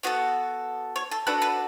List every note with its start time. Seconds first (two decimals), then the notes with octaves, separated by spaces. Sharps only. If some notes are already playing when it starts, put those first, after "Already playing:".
0.03 B3 F#4 A4 C#5
0.96 C#5
1.11 A4
1.27 D4 F#4 A4 B4
1.42 B4